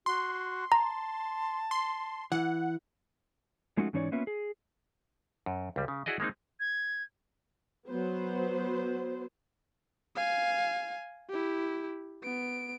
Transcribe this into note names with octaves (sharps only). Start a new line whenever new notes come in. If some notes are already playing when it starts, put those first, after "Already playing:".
F#4 C6
A5 A#5
C6
E3 F#5
F3 G#3 A3 C#4 D#4 F#4
G#2 E3 C#4 D#4 C#5 D5
A#3 B3 C#4 F4 B4 E5
G#4
F#2
C#2 G3
C#3
E4 F#4 G#4 D5 D#5
G#3 A#3 C4 D#4
G#6
F#3 B3 C5
F5 G#5
E4 G4
B3 D7